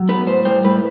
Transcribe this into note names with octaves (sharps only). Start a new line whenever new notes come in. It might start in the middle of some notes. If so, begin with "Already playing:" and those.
Already playing: F#3
B3 B4
A2 C5
G3 C5
A2 B4